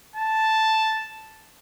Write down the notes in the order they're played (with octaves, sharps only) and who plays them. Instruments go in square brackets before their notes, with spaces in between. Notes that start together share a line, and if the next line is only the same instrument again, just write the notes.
[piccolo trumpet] A5